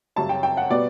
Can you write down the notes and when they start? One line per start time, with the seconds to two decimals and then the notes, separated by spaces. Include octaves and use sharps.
0.16 F#2 C#3 G3 C#4 A5
0.29 G5
0.43 G5
0.57 F#5
0.70 B2 G3 B3 D5